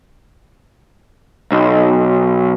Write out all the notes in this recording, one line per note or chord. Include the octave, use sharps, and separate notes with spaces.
B1